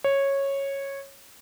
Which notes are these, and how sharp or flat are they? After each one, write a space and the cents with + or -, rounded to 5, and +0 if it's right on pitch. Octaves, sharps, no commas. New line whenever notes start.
C#5 -10